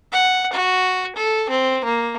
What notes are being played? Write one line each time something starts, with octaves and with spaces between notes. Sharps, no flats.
F#5
F#4
A4
C4
A#3